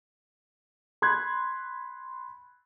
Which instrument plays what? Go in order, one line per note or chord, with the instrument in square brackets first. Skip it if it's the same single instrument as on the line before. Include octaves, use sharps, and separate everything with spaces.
[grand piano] B5 C6 F#6 G#6